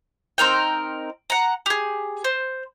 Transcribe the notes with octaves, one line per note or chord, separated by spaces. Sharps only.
C4 D#4 A#4 G5
F#5 A#5
G4 G#4
C5